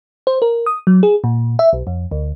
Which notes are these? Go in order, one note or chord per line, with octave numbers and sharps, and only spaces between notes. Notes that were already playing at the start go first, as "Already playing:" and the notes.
C5
A#4
D#6
F#3
G#4
A#2
E5
B1
F2
D2